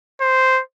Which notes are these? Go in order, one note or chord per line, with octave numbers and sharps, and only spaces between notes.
C5